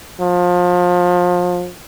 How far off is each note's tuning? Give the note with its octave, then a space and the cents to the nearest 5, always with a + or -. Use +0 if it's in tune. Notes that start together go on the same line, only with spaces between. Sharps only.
F3 +30